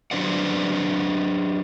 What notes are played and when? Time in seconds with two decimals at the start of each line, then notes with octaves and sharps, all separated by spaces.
0.11 F#3 D4 B4 C5 D5 F#5